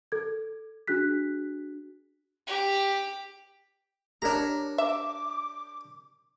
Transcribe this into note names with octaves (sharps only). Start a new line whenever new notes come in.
A4 G#6
D4 F#4 G#4 F#6 B6
G4
D4 G4 A#4 C#5 A#5
E5 D6